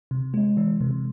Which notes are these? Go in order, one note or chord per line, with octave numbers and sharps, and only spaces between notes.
C3
G#3
E3
C3